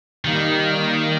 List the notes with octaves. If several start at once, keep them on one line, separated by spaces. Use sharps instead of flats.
D#3 G3 A#3 D#4